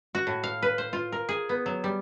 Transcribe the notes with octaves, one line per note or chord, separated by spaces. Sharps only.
F#4
A2
F5
B4
C5
F4
A#4
G#4
B3
F#3
G3